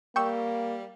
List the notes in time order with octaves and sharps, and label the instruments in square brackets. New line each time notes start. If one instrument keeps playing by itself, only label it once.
[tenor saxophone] G3 [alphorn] A#3 [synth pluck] G5 C#6 E6